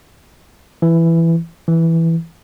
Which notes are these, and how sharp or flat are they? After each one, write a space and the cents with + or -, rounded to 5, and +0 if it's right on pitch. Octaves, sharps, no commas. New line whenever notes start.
E3 +10
E3 +0